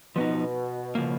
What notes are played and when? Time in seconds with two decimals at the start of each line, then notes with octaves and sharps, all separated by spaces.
0.16 B2 F3 B3 D#4
0.95 C#3 F3 A#3